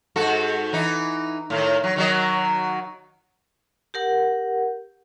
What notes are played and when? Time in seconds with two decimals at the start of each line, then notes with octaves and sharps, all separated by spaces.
0.16 G#2 F#4 A4
0.73 E3 D#4
1.50 A2 D#3
1.84 F#3
1.96 D#3 F#3 D#5
3.94 G4 A#4 F#5